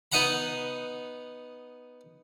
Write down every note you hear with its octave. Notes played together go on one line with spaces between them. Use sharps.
B3 D#4 D#5 F#5 A#5 B5